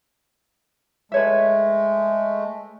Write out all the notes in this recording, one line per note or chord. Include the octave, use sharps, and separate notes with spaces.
G#3 A3 B4 C#5 E5